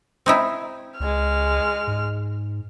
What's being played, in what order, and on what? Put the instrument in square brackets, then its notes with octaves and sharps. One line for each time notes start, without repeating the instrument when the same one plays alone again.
[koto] C4 D#4 E4
[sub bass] C#2 [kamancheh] G#3 F6
[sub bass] G#2